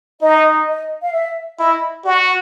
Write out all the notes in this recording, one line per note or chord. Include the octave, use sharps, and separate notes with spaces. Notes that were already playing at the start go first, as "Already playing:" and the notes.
D#4 D#5
D#5
F5
E5
E4 D#5
F#4 D5